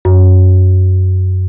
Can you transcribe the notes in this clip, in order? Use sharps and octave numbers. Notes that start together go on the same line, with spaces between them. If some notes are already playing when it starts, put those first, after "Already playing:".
F#2